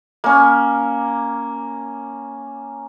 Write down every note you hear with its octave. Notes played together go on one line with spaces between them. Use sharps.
A#3 C#4